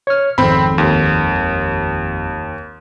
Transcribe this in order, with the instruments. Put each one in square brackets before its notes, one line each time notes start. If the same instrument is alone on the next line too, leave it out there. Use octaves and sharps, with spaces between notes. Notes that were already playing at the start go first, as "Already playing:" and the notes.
[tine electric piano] C#5 F6
[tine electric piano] G#1 F2 [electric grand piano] C4 B5
[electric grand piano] D#2